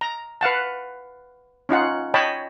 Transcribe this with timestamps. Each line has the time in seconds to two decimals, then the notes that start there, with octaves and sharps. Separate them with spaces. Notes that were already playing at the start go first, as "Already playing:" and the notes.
0.01 A#5
0.41 B4 F5 F#5 A5
1.69 C#4 D#4 F4 F#5
2.14 C#5 D#5 G5 A5 B5